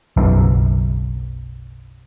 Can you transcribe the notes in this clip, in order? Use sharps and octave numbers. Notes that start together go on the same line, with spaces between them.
F#1 B1 F#2